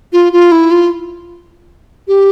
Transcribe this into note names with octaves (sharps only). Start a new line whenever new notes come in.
F4
F4
E4
F4
G4